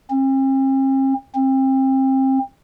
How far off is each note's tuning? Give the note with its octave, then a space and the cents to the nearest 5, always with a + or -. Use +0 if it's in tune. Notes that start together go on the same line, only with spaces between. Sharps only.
C4 +45
C4 +30